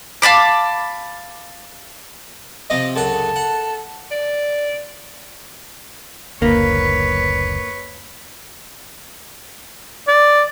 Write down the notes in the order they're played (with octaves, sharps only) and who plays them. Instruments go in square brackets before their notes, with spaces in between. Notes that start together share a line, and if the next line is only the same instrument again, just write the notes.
[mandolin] F5 A5 B5 D6
[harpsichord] C3 F3 [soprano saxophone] D#5
[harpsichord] C#2 F#2 F#5 [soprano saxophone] A4
[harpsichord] F#5
[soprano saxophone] D5
[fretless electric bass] F#1 D2 [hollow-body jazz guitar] A#3 [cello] B4 C#5
[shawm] D5